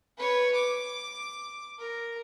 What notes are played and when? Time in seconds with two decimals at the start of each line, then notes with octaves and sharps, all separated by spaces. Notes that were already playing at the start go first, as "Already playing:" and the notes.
0.17 B4 C#5
0.54 D6
1.79 A#4